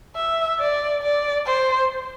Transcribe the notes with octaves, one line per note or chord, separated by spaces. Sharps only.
E5
D5
D5
C5